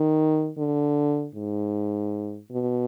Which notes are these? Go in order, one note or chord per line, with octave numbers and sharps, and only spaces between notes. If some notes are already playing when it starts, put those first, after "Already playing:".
Already playing: D#3
D3
G#2
B2